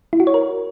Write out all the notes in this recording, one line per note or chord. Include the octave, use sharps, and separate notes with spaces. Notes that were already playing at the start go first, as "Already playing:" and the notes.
E4
F#4
C#5
A#4